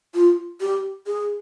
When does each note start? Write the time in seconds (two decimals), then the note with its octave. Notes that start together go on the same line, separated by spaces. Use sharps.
0.15 F4
0.61 G4
1.06 G#4